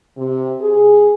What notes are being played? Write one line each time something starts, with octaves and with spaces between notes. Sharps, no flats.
C3
G#4